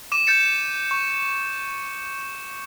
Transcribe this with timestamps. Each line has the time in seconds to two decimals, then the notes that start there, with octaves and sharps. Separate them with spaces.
0.12 D6 D#7 E7
0.26 G6 A6 C#7 E7
0.91 C#6